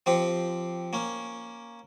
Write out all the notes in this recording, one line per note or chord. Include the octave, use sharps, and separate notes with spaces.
F3 C4 G4
A#3 C#4